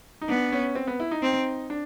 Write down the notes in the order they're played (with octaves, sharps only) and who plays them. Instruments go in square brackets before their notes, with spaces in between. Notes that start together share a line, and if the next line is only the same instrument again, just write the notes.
[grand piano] D#4
[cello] B3 [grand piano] D4
[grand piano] C#4
C4
B3
E4
D#4
[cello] C4
[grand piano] D4